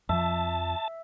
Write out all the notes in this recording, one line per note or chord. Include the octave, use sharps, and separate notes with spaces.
F2 F3 E5 A5